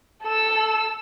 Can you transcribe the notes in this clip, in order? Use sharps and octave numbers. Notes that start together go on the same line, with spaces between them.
A4 E6